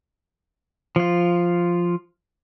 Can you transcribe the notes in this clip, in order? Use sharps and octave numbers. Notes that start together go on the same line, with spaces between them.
F3 F4